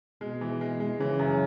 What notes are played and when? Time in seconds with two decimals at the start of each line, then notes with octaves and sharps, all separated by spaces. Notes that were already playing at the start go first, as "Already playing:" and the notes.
0.21 B2 G#3
0.41 E3
0.61 G#3
0.80 G#3
1.00 C#3 E3
1.19 F#2